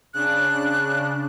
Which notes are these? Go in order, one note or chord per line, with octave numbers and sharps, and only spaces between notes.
C#3 D4 F#6